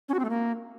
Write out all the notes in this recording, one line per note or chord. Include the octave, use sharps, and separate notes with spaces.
C#4
F#4
C4
A3
A#3